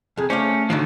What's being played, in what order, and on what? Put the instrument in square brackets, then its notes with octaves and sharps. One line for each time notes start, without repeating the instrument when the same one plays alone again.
[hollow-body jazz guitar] F2 C3 [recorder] G#4
[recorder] A3 [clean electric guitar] C#4 [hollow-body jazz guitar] C5 D5 F5
[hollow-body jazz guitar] A2 F#4 F5 [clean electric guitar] D3 D#3 F3